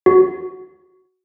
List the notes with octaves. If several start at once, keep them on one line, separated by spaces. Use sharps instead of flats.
F#4